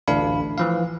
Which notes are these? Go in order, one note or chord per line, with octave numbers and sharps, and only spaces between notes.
A1 D2 D4 F5 B5
E3 F3 F5